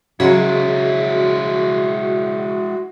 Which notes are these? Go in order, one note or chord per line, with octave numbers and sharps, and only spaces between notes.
C#3 F#3 G#3 E4 F#4 G#4 D#5